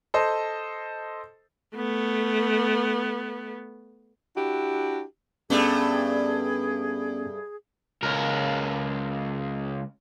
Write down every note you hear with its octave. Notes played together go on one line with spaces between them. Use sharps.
A4 C5 D#5
A3 B3
D4 E4 F#4 G4
G2 A3 B3 C#4 G#4
C#2 A#4